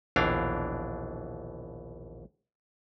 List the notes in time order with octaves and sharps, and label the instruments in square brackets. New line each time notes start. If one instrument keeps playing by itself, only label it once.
[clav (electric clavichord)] A#1 D#2 B2 E3 D4 F5